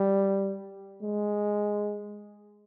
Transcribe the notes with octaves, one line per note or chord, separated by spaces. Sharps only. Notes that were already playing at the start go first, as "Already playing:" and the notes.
Already playing: G3
G#3